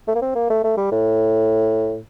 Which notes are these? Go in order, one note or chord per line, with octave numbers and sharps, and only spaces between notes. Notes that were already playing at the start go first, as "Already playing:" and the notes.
A3
A#3
C4
A#3
A3
A3
G3
A2